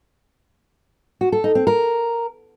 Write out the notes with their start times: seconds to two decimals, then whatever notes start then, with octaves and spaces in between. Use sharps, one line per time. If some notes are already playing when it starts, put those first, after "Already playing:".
1.21 F#4
1.32 A4
1.44 D#4
1.55 C4
1.67 A#4